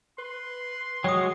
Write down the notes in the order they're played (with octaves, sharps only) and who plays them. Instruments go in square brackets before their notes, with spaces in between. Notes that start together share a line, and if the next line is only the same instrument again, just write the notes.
[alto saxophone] B4 [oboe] C6
[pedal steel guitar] F#3 G#3 F#4 [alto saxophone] C#5 [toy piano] G5 D#6